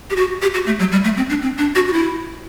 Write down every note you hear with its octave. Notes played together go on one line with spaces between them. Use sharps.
G4
F#4
G4
F#4
A3
F#3
G3
A3
C4
D4
C4
D4
F#4
F#4
E4